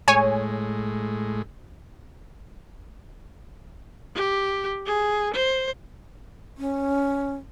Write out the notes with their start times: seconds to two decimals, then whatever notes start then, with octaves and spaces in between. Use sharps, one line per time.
0.08 A2 G#3 C#5 G#5
4.15 G4
4.86 G#4
5.34 C5
6.58 C#4